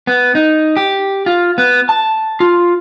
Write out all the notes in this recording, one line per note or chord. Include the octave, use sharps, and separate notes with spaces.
B3
D#4
G4
F4
B3
A5
F4